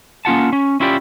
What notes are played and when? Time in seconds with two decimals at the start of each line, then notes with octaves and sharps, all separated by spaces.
0.25 A#3 C#4 F4 F#5 A5
0.53 C#4
0.80 C#4 E4 F4 G4 A#4 D5